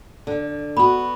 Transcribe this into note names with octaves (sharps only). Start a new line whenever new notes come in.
D3
B3 F#4 B5